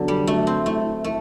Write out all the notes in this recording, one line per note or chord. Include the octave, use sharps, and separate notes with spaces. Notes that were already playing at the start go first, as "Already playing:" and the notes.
Already playing: D3 F#3 B3
G3
F#3 A3
C4
A3 E4
A3 E4